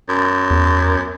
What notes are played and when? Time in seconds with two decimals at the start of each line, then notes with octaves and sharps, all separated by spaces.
0.09 F#2
0.51 E2